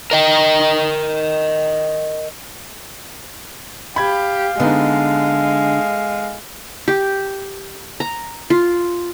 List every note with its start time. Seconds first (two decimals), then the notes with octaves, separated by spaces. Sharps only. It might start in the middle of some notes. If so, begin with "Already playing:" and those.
0.11 A#4 D#5 G5
3.96 G4 F5 B5 G#6
4.60 D3 G#3 B3 D#4
6.88 G4
8.00 A#5
8.50 F4